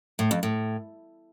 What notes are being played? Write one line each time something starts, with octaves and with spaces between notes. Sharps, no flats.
A2
F2
A2